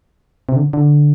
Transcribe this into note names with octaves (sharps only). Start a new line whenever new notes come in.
C3
D3
D3